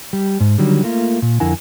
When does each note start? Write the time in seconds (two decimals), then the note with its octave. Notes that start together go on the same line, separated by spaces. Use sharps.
0.13 G3
0.40 G#2
0.58 D3 D#3 F#3 G3
0.83 A3 A#3 F4
1.22 A#2
1.40 F2 D3 E4 A#4 F#5 G#5